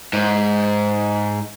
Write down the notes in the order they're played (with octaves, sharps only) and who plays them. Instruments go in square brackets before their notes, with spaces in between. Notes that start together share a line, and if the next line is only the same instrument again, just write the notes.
[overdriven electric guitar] G#2